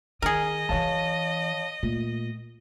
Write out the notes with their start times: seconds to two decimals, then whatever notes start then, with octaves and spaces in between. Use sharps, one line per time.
0.22 D#3 G#4 A#4 D#5
0.69 F#2 E3 C#5 F5 A5
1.83 A#2 A3